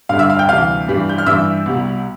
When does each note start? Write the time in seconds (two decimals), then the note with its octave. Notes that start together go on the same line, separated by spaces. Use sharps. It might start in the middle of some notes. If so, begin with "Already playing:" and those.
0.09 G2 D3 G3 F5 F6
0.19 E5 E6
0.30 F5 F6
0.39 G5 G6
0.49 D2 C3 E3 G3 F5 F6
0.88 G2 E3 G3
1.09 G6
1.18 F6
1.26 G2 E3 G3 E5 E6
1.66 C2 B2 G3